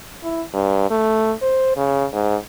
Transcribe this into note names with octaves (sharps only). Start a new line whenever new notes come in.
E4
G2
A3
C5
C#3
G#2